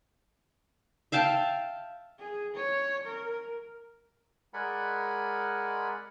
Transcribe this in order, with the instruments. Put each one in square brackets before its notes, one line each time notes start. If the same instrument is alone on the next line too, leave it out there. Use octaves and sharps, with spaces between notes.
[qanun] E5 F5 G5 A5
[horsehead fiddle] G#4
C#5
A#4
[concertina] G#3 A#4 D5 F#5 G#5 B5